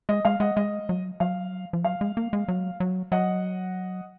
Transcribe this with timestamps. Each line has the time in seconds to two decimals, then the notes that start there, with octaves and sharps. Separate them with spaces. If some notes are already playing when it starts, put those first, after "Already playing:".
0.09 G#3 D#5
0.25 G#3 F5
0.40 G#3 D#5 F#5
0.56 G#3 D#5
0.89 F#3
1.20 F#3 F5
1.73 F3
1.84 F#3 F5
2.01 G#3
2.17 A#3
2.33 G#3
2.48 F#3
2.80 F#3
3.12 F#3 D#5 F#5